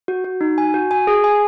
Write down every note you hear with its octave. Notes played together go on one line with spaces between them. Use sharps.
F#4
F#4
D#4
G#5
F#4
G#5
G#4
G#5